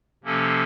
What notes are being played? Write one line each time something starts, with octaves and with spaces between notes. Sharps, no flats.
C3 F3 A#3 C#4 A4